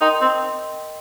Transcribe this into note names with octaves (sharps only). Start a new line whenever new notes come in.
D#4 A#4 D#5 G5 C6
C4